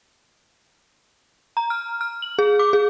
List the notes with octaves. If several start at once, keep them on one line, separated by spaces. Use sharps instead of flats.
A#5
F6
F6
F#7
G#4
D6
G#4